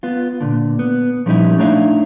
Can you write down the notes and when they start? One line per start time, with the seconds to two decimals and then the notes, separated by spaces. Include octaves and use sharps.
0.03 B3 F4
0.41 A#2 D3
0.79 B3
1.26 A#2 F3 G3 C#4 D#4 E4
1.58 A3 D4 D#4 C#5 E5 F5